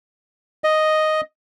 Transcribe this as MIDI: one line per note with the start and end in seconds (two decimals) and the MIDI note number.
0.64 1.21 75